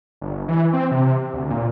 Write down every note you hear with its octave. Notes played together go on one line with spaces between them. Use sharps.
G1
E3
C4
C3
D2
A#2